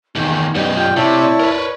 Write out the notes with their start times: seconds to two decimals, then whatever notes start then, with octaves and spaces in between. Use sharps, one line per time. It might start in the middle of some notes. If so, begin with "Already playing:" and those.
0.15 E2 D#3 D#4
0.55 F#2 G3 B3 D#4 D5
0.77 F4 G4 G5
0.96 C3 E4 C#5 A5
1.40 A#4 B4
1.56 C#5